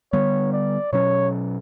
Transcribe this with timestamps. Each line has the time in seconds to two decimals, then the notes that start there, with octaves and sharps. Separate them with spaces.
0.13 D3 G3 B3 C#5
0.53 D5
0.93 B2 F#3 C#4 C#5